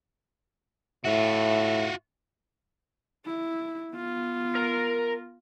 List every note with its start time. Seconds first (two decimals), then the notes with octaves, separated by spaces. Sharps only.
1.05 A2 F4 F#4 E5
3.25 E4
3.94 B3 F4
4.55 A#4 A#5